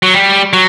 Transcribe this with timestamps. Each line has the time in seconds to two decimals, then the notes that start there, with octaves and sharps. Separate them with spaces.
0.03 F#3
0.13 G3
0.53 F#3